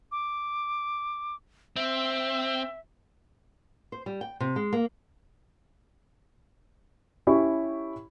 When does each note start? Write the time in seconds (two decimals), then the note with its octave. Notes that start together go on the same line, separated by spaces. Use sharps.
0.12 D6
1.76 C4 E5
3.92 C5
4.06 G3
4.21 G5
4.40 C3
4.56 G#3
4.73 A#3
7.27 C#4 E4 G4 B5 C#6